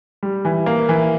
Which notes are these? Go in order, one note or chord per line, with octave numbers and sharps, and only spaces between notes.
G3
E3
A#3
E3